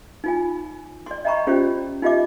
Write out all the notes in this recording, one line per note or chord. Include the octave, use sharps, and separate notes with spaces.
D#4 F4 G#5
D5 C6
D#5 E5 G5 A#5 B5 C#6
C#4 F4 G4 C5 D5
D#4 F4 G4 D#5 E5 D6